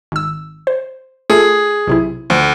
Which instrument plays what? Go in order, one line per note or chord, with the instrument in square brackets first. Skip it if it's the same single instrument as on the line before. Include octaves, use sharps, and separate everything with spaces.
[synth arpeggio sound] G#1 E6
C5
[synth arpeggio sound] A3 F4 A4 [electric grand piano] G#4
[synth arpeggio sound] B1 C3 E4
[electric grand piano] D2 [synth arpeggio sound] F3